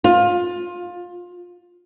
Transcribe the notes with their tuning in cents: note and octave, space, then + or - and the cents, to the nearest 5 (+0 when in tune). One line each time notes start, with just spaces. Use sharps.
F4 +20